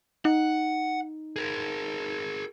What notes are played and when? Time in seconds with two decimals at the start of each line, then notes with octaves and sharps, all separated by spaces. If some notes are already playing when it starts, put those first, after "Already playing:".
0.25 D#4 F#5
1.36 G#4 A#4